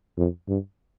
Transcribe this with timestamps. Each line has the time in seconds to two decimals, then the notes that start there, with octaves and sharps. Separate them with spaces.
0.17 F2
0.48 G2